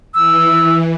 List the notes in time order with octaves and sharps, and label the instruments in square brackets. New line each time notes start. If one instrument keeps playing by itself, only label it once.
[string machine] E3 [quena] E6